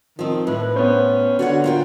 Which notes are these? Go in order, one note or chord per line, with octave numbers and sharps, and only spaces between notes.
D#3 F3 C4
A2 B4
B3 C#4 C5
D3 F#4 C#5 F#5
A#3 F4 G5